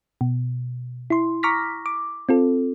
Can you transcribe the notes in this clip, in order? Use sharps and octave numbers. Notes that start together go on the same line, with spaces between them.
B2
E4 C6
A#5 C#6 D6 F6 A#6 B6
D6
C4 F4 A4